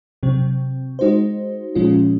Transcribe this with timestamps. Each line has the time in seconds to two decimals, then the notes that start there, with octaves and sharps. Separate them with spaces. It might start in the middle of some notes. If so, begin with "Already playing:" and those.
0.23 C3 F#3 C4
0.99 G#3 D#4 F#4 C5
1.75 A#2 F3 G#3 C#4 F4